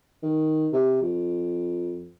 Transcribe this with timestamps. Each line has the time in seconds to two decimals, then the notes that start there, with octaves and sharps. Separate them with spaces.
0.23 D#3
0.73 C3
1.02 F2